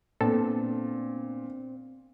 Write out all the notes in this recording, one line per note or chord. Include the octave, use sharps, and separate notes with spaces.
A#2 B3 C4 D4 A4